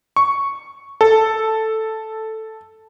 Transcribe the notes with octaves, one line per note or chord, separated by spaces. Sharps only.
C#6
A4